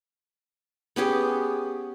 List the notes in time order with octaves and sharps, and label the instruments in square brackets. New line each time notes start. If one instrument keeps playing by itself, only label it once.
[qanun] B3 C#4 G4 G#4